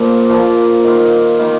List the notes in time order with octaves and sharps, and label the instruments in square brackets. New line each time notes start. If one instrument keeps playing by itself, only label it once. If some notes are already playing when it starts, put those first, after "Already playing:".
Already playing: [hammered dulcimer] A#2 F3 A#3
A#2 F3 A#3
D#3 A#3 F4
D#3 A#3 F4